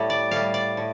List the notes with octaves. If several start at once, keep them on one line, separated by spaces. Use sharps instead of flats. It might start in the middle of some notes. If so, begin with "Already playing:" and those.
Already playing: A2 G3
D5
A2 G3 F5
D5
A2